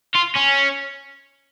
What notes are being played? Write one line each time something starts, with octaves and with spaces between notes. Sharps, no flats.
F4
C#4